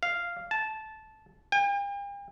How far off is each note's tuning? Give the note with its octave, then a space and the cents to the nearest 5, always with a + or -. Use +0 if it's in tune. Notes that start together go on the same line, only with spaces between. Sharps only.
F5 -5
A5 -10
G5 +45